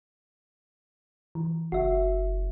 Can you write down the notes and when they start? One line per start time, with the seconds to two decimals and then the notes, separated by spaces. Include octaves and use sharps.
1.35 E3
1.72 F#1 F#4 E5